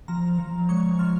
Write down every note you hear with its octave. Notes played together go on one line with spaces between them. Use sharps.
F3 A#5
F3
G#3 C#6
F3 F6